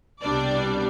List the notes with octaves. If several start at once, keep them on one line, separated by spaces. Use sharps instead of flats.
C2 B2 G3 D4 D5